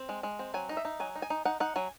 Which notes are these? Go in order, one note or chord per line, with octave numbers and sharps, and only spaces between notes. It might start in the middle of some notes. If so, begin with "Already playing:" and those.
Already playing: C4
G#3
G#3
C4
F#3 G#5
D#4
E5
D#4
F#3 G#5
D#4
G#5
D#4
D#4 F#5
D#4 F#5
F#3 G#5